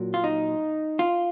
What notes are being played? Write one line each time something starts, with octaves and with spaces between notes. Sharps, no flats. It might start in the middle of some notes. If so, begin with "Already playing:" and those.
Already playing: A#2 F#3 A#3
F4
D#4
F4